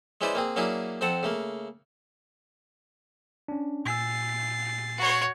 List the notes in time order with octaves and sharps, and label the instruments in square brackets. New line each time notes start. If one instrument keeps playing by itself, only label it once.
[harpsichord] G#3 C#4 E4 B4 C5 D5
A#3 C4 G#4
F#3 A#3 C#4 D4 E4 G#4
F2 C4 A4 F#5 A5
C#3 A3 A#3
[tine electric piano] C#4 D4
[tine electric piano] A#2 G#5 E6 [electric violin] A6 C7
[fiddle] F#4 C#5